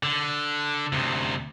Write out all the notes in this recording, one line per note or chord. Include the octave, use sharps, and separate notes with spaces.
D3
D2 C3